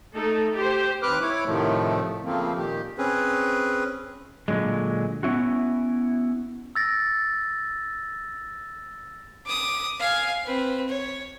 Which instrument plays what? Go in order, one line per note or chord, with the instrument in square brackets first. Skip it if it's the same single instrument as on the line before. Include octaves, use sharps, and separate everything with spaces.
[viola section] A3 D#4 A4
G4 C5
[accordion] D#2 C4 B4 D6 F6 F#6
E4 C#5 D6
A2 C3 D#3 F3 A3
C#3 F3 A3 A#3 C4
A#2 D#3 G4
[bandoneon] C4 C#4 G#4 B4
[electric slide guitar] A#2 D3 F#3 G#3
B3 C#4 E4 F#4
[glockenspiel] E6 A6 A#6
[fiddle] D6 D#6
F5 G#5
C4 B4
C#5